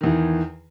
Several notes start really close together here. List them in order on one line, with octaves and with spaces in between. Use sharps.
D#3 E2 E3